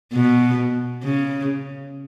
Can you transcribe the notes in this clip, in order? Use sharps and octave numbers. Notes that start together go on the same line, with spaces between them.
B2
C#3